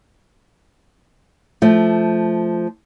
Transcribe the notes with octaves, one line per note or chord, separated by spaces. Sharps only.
F3 A3